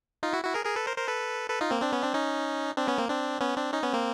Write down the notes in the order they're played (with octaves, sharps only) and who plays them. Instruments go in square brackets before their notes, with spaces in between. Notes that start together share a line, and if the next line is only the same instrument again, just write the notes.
[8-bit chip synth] D#4 F4
E4 F#4
E4 F#4
G#4 A#4
G#4 A#4
A4 B4
A#4 C5
A#4 C5
A4 B4
A4 B4
D#4 F4
A#3 C4
C4 D4
B3 C#4
C4 D4
C#4 D#4
C4 D4
B3 C#4
A#3 C4
C4 D4
B3 C#4
C4 D4
C#4 D#4
B3 C#4
A#3 C4